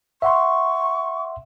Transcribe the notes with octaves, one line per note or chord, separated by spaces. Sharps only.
E5 F#5 C6 C#6